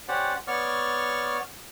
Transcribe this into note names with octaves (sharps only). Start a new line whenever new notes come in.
C#4 G4 C5 D5 F#5
B3 C#5 D5 C#6 F6